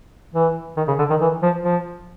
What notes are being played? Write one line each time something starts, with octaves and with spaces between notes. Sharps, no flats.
E3
D#3
C#3
D3
D#3
E3
F3
F3